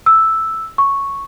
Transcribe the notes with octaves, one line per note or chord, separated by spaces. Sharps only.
E6
C#6